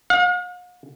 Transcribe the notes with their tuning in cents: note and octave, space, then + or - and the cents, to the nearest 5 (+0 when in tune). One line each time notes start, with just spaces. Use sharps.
F5 +45